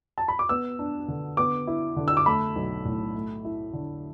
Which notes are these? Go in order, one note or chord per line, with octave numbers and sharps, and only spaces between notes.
A5
B5
D6
B3 E6
D4
D3
B3 D6
E4
D3
E6
D6
A3 B5
B1
A2
A3
E4
D3